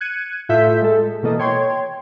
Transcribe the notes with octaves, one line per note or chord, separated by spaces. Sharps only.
F#6 G#6 C#7 D#7
A2 F4 A4 E5 G6 B6
G#3 A4
B2 E3 A#3 A4 D#5
C#5 G5 C6 G#6